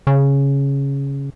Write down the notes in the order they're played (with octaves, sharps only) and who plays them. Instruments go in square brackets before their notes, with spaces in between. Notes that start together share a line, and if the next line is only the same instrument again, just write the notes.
[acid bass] C#3